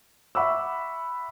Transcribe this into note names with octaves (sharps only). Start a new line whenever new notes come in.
E5 F#5 B5 C#6 D6 E6